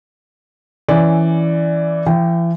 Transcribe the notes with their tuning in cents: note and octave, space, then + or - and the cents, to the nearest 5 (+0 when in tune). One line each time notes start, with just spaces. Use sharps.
E3 +0 C#4 +0 D5 +0
E3 +40 G5 +0